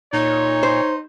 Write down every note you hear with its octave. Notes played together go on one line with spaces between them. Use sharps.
A#2 D#4 C#5
C5